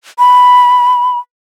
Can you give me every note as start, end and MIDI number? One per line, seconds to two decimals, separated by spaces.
0.19 1.18 83